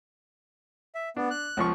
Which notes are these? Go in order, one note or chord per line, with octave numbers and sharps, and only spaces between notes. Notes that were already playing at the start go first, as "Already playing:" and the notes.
E5
B3 D4
F#6
C#2 F3 C#6